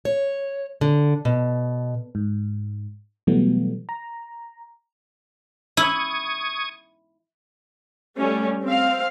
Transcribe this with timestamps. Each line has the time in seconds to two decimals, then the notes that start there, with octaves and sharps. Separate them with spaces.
0.05 C#5
0.81 D3
1.25 B2
2.15 G#2
3.27 B2 E3 F#3 G3 A3 B3
3.89 A#5
5.77 E4 C#6 D#6 G#6
8.17 G3 A3 C#4
8.63 C4 F5